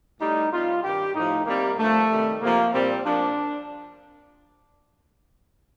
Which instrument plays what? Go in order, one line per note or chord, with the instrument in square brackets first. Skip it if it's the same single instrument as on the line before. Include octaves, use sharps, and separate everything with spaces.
[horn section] A2 G3 D#4
C3 G3 F4
G2 D#3 G3 G4
A2 F3 D#4
C3 G3 A#3
G2 D3 F3 A3
C3 D#3 G3
C3 F3 A#3
A#2 G3 C4
A#2 F3 D4